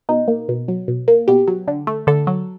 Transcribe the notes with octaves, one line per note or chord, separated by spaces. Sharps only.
B2 D#4
A#3
B2
F#3
B2
A#3
B2 G4
F#3
D3
A3
D3 A4
F#3